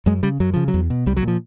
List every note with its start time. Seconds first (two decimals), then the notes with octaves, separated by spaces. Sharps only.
0.06 F#2 G#3
0.23 C#3 G3
0.40 F#2 F#3
0.54 C#3 F3
0.68 F#3
0.74 E2
0.90 B2
1.06 C2 G3
1.16 F#3
1.22 A#2
1.28 F3